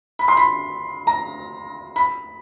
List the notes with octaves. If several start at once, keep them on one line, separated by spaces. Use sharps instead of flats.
B5
C6
B5
A#5
B5